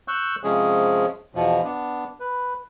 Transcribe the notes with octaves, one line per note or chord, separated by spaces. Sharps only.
C#6 E6 F#6 G6
C3 F3 G#3 C#4 G#4
E2 B2 F3
B3 D4
B4